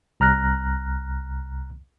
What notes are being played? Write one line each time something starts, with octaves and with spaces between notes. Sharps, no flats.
C2 A#5 F6 F#6 A#6